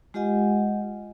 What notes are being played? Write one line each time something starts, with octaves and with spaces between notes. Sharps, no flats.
G#3 F4 G4 D#5 F#5 G#5